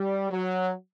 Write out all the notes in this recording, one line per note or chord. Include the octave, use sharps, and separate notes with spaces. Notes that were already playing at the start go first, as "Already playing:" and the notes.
Already playing: G3
F#3